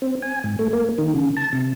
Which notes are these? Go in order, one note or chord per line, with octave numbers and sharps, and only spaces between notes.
C4
G#5
G#2
A3
A#3
D#3
C#3
A5
C3